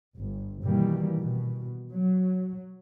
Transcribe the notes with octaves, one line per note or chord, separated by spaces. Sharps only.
G1
B2 D#3 E3 G3 A#3
B2
F#3